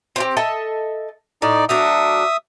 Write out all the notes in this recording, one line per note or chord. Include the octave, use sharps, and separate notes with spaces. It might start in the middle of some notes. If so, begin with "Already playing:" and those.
C4 E4 G4
A4 D#5 E5
A2 D#4 D5
F#3 A3 D4 E5 D#6